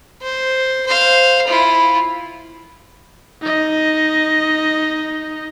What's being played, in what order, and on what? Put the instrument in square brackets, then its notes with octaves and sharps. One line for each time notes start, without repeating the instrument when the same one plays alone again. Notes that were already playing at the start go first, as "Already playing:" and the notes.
[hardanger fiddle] C5
C5 F5
E4 F4
[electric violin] D#4 D#5